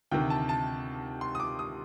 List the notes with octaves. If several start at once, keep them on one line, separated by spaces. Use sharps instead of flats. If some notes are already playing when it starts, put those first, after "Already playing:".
D2 C3 D#3 G5
A5
A5
C6
D#6
D6
D#6